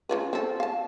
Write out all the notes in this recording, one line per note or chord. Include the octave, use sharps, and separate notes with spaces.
C#3 F4 B4
C4 A4
F5 A5